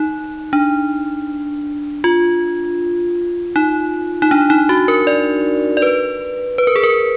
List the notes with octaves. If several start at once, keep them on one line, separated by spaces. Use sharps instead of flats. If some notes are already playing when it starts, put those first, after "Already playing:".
Already playing: D#4
D4
F4
D#4
D#4
D4
D#4
F#4
A#4
D5
D5
B4
B4
A#4
G#4
A#4